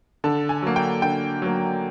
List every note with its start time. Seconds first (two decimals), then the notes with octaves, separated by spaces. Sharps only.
0.24 D3 A5
0.49 G#5
0.62 F#3 A#3
0.76 G5
1.02 D3 G5
1.42 F#3 A#3